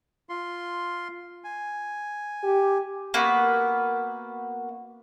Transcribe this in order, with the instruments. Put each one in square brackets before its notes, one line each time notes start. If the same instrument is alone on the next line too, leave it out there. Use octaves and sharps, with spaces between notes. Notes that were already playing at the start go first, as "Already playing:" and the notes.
[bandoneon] F4 C6
G#5
[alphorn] G4
[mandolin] A#3 B3 F#4 B4